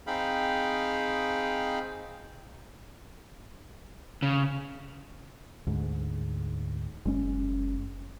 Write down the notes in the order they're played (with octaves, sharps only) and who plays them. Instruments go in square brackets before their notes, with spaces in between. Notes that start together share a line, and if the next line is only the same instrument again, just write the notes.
[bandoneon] C4 D#4 G#4 F5 G5 B5
[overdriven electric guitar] C#3
[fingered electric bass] D2 G#2
F#1 G#3 C#4